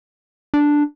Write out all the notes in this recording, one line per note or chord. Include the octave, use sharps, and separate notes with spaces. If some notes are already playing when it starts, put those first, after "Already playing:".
D4